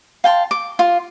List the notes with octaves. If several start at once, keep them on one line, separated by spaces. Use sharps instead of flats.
F5 G5 A5 C6
D6
F4